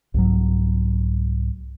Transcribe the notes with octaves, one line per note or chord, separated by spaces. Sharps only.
C2 G#2 F#3